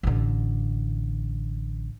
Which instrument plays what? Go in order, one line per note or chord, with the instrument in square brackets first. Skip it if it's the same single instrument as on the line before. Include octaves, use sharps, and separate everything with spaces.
[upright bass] A1 D3